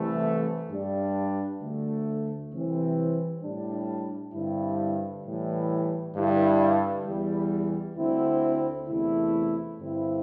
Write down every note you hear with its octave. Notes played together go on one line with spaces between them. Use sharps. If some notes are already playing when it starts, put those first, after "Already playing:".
Already playing: C2 C3 E3 A3
G2 G3 D4
D2 D3 A3
C2 C3 E3 C4
A2 G3 D4
G2 D3 G3 C4 E4
A2 E3 G3
G2 D3 G3 E4
E2 E3 G3
D2 D3 C4 E4
E2 C3 A3 E4
G2 D3 C4 E4